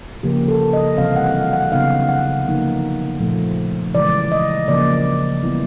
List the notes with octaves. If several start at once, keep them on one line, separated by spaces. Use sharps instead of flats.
C#3 F3 A#3 G4
A4
D#5
C3 E3 G3 C4 F5
F#5
F5
F#5
C#3 F#3 B3 D#4 F5
F#5
D3 F3 A#3 D#4
A#2 F3 A3
C#3 E3 G#3 D5
D#5
C#3 F3 A#3 D5
E3 G3 B3 E4